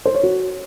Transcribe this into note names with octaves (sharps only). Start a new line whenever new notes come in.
C5
C#5
F#4